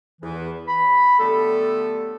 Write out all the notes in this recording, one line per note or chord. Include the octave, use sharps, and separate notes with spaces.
E2 E3
B5
D3 F#3 G3 A3 B3 A4